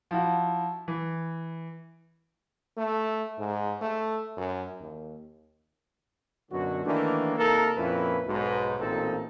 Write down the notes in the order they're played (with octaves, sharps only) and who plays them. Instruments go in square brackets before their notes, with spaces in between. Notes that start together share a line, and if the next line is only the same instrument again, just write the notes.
[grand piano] F3 E4 F#4
E3
[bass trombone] A3
G#2
A3
F#2
D#2
[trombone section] F#2 B2 D3 F#3 F#4
D#3 E3 A3 A#3 D4
C3 A#3 D#4 A4 A#4
F2 A#2 A#3 C#4 E4 B4
B1 G#2 B2
A1 A#2 C4 D#4 A4